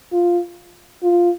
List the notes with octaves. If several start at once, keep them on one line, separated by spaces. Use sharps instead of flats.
F4
F4